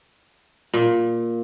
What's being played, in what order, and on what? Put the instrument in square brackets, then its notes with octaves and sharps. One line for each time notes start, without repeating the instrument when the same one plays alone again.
[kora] A#2